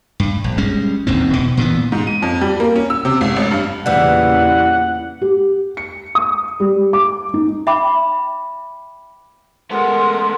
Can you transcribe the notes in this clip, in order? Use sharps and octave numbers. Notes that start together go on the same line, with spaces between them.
G2
A#1
G3 G#3 C#4
E1 D#2 G#2 C4
B2
A#2 E3 B3
G#2
D#7
F2
G3
A#3
C#4
E6
C3
G#1
A1
G2
E2 A#2 C#3 E3 G3 F#5
G4
C#7
D#6
G3
D6
D#4
E5 G5 B5 D6
G#3 A3 B3 A#4 F#5 C6